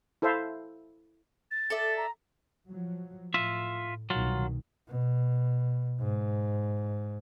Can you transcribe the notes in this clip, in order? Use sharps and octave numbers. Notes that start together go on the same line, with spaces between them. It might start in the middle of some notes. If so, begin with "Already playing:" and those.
E4 A4 C5 E5 F5
A6
A4 D5 E5
A#5
F3 F#3
A2 F4 E5
C2 B2 D#3 F#3 F4
B2
G#2